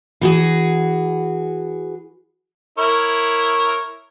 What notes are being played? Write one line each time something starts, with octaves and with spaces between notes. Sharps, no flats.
E3 F#4 G#4
E4 A#4 C#5